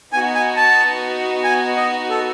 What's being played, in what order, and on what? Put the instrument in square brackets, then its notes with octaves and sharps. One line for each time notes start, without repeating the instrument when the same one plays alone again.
[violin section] B3 D#4 F#4 [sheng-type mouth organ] G#5
[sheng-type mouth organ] G#5
A5
G#5
D#5
A4